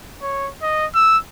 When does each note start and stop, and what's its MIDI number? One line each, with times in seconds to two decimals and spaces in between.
0.22 0.50 73
0.62 0.86 75
0.95 1.18 88